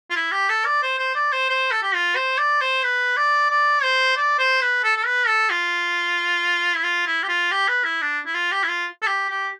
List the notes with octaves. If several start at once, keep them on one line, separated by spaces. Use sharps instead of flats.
F4
E4
G4
A4
D5
C5
C5
D5
C5
C5
A4
G4
F4
C5
D5
C5
B4
D5
D5
C5
D5
C5
B4
A4
A4
B4
A4
F4
E4
F4
E4
G4
F4
G4
B4
E4
D4
E4
F4
G4
E4
F4
A4
G4
G4